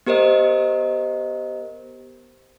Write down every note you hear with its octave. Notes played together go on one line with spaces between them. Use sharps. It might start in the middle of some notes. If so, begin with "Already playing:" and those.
B3 G4 A#4 C5 D#5